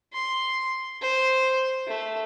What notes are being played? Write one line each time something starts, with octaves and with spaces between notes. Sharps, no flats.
C6
C5
A3